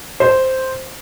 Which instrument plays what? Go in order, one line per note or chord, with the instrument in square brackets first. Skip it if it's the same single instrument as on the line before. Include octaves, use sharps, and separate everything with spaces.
[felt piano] C5